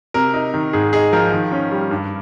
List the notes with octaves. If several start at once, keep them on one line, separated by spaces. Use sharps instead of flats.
C3 A#4
D#4
D#3
G#2 G#4
D#4 G#4
F3 A#4
D#3
C#4
G3
G2